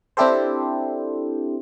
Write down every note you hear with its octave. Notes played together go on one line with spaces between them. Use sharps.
C4 D4 E4 G4 A4 C5